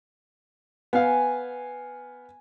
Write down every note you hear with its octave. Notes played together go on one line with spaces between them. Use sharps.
B3 F5 G#5